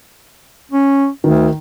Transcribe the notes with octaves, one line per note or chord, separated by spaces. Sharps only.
C#4
D2 D#3